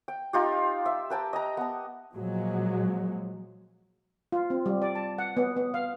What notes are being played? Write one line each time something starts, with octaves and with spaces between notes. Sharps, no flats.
G5
D#4 F4 G4
E5
B4 G5 A5 A#5
D#5 A#5
B3 A5
A#2 F3 F#3 G#3
F4
C4
G3
D5
A5
F#5
B3
B3
F5